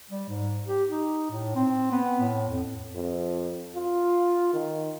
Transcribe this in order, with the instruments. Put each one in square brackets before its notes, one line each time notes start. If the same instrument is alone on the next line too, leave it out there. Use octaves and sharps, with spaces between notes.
[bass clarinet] G3
G#2
G4
D#4
A2
C4
B3
A2
F2
[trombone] F2
F4
D#3